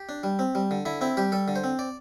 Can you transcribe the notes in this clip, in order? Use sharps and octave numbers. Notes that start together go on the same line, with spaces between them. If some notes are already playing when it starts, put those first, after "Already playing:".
Already playing: G4
D4
G3
C4
G3
D3
D3 E4
C4 E4
G3 G4
G3 A4
D3
C5
C4
D5